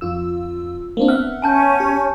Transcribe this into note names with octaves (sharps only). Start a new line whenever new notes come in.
F2 F4 E6
A#3 C4 D4
B3 E5 F#5 F6
C#4 G#5 A5 G6
G4